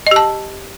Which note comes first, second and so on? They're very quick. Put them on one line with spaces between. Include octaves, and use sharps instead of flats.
D#5 G4 A5